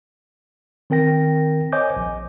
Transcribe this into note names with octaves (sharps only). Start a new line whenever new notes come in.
D#3 C4 A#4 G5 A#6
C5 C#5 D#5 G#5 D6 G6
A#1